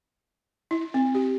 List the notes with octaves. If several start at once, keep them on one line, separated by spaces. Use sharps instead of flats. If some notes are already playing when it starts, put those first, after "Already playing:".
E4
C4
G4